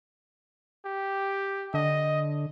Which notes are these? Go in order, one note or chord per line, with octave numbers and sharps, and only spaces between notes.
G4
D3 D#5